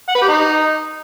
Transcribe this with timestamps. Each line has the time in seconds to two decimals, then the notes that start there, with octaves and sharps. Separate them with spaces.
0.09 F#5
0.15 B4
0.22 G4
0.28 D#4